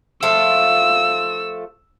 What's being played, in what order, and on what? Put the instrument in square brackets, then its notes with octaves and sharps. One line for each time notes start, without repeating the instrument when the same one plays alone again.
[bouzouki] F3 A3 F4 [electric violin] E6